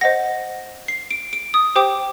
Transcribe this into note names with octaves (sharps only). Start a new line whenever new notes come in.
C5 D#5 F#5 A#6
C7
D7
D7
D#6
G4 C5 G5 D6